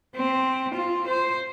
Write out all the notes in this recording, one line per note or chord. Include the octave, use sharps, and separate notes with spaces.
C4
F4
C5